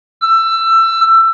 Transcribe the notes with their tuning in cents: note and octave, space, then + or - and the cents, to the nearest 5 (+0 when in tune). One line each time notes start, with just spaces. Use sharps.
E6 +20